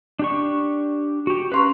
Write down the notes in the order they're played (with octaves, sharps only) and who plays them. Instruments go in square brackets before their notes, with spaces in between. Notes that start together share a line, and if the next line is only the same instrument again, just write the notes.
[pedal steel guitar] D4 G4 C#6
F#4 G4
[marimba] C#4 C6 C#6 [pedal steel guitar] B4 F5 A#5